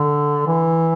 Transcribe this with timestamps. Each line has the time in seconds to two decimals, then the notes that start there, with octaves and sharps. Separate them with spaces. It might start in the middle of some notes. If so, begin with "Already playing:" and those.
Already playing: D3
0.47 E3